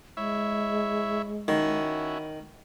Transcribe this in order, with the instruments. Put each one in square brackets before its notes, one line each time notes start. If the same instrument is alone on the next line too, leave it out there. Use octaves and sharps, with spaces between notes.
[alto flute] G#3 [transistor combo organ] E4 C#5 E5
[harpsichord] D#3 [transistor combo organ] C#4 E4 F#4